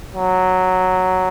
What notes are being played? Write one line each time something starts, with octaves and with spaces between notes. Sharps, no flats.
F#3